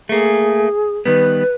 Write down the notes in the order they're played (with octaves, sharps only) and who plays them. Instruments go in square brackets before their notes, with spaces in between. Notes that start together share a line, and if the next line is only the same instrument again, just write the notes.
[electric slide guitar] A3 A#3 [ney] G#4
[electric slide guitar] D#3 G3 B3 [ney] B4